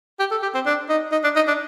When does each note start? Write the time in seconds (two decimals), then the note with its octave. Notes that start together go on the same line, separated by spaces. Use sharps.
0.19 G4
0.31 A4
0.43 G4
0.54 C4
0.66 D4
0.89 D#4
1.12 D#4
1.24 D4
1.36 D#4
1.47 D4